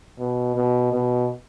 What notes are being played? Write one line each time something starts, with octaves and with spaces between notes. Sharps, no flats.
B2
B2
B2